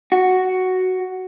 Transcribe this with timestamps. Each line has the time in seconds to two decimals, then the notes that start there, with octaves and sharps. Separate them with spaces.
0.12 F#4